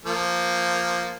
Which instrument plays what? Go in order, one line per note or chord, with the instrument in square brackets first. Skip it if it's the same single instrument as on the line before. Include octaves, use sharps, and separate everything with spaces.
[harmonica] F3 A#3